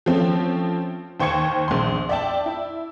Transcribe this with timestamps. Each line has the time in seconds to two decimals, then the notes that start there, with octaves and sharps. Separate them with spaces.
0.06 F3 A3 C4 C#4
1.20 D#2 C5 G5 C#6 G#6 C#7
1.68 A#1 C6
2.09 D5 E5 G5 A5
2.46 E4